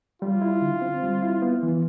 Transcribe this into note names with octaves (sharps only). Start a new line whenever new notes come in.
G3 F4
E4
D3
C4
G3
E4
B3
E3